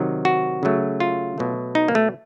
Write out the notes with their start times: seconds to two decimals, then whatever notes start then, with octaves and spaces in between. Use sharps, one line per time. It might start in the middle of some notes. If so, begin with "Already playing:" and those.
Already playing: C3 D#3 F#3
0.25 F#4
0.63 C#3 F#3 A3
1.00 F4
1.38 B2 F#3 A3
1.75 D#4
1.88 A#3
1.95 A3